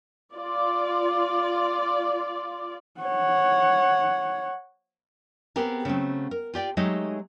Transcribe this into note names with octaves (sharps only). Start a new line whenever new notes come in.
F4 D5
C#5 F#5
B3 C4 G4 G#4 A#4
C#3 F#3 A3 C4
A#4
F4 G4 D5 G5
F#3 G#3 A3 D#4 G4 D#5